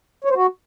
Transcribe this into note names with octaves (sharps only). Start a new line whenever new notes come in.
C#5
C5
F#4